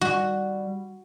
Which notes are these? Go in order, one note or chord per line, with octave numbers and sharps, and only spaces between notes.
G3 F#4